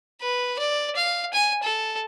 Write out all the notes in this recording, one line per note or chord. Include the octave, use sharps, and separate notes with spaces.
B4
D5
F5
G#5
A4